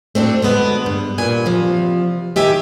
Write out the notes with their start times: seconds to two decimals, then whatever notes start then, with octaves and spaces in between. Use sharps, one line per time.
0.15 A3 C4 D4 F#4
0.42 D3 G#3 B3
0.86 G2
1.18 G2 A#2 B4 G#5
1.46 C3 F3
2.36 D#3 G4 E5 G#5